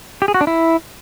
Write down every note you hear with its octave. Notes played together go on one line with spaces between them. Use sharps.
G4
G#4
F#4
D4
E4